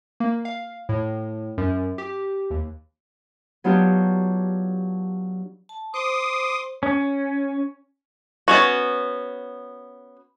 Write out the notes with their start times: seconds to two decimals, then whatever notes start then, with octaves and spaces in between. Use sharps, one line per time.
0.20 A#3
0.45 F5
0.89 A2
1.58 F#2
1.98 G4
2.50 D#2
3.64 F#3 B3 D4 D#4 F4 G4
5.69 A5
5.94 C5 C6 D6 D#6
6.83 C#4
8.48 B3 C#4 F#4